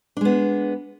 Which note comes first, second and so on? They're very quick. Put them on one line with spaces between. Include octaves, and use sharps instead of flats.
D4 G#3 B3